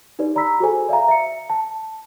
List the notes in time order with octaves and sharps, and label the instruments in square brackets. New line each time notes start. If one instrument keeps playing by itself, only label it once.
[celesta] D#4 G4 B4 D5
D5 A#5 B5 E6 B6
F#4 G#4 A4 C5 G#5
D5 E5 F5 A#5
E5 C#7
A5